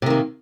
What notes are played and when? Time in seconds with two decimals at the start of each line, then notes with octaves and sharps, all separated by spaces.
0.02 C3
0.06 D#3
0.10 A#3